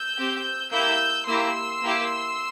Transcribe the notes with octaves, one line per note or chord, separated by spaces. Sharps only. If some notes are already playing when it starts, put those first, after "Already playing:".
Already playing: E6 G6
C4 G4
A#3 E4 G4 E6 G6
A#3 E4 G4 C6 E6
A#3 E4 G4